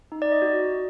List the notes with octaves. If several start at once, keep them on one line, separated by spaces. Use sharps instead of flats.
D#4
D5
D#5
F#4